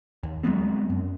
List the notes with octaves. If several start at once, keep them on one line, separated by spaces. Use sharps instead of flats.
D#2
F#3 G#3 B3 C4
F#2